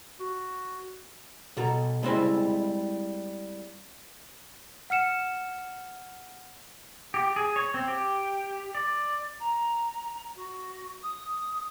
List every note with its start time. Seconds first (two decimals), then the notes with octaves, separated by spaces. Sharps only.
0.20 F#4
1.57 B2 A4 A#5
2.03 G3 G#3 C4 E4
4.90 F#5 F6 C#7 E7
7.14 G4
7.36 G#4
7.56 C#5
7.74 C4
7.88 G4
8.75 D5
9.40 A#5
10.35 F#4
11.02 D#6